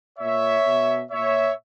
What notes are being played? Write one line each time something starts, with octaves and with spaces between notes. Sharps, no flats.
A#2 C#5 E5
B2
A#2 C#5 E5